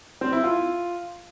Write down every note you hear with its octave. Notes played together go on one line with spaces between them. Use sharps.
C4
E4
F4